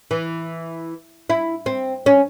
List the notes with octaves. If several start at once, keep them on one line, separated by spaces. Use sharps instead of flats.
E3
E4
C4
C#4